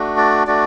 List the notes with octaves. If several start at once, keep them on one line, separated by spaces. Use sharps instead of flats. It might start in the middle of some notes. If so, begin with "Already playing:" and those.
Already playing: A3 D4 F#4
D5
A3 D4 F#4 D5